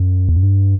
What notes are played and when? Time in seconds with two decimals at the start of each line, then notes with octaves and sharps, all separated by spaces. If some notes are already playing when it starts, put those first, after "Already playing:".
Already playing: F#2
0.29 E2
0.36 F#2
0.43 G2